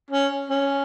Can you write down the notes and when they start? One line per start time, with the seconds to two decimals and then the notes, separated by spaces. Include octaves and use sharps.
0.11 C#4
0.49 C#4